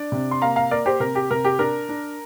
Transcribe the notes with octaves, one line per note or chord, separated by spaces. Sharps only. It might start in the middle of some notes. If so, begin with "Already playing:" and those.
Already playing: D4 D5
C3
C6
A#3 F5 A#5
F5 A#5
A#3 A#4 D5
G4 C5
C3 A#4
G4
C3 A#4
G4
D4 A#4
D4